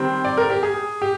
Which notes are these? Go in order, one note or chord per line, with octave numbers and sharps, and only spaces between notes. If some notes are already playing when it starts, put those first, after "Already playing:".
Already playing: D#3 G3 C4
D5
A#4
G4
G#4
G4